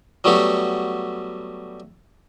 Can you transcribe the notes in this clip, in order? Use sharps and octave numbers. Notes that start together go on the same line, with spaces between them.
F#3 G3 A3 B3 F#4 G4